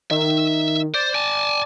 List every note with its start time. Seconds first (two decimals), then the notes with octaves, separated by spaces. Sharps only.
0.11 D#3 E5
0.94 C5 D5
1.15 G#5 A5